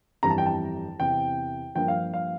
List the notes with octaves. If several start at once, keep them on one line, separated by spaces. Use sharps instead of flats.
G1 F2 E3 G3 A#5
A5
G5
A5
E2 C3 E3 G5
G2 F3 A#3 G5
F5
F5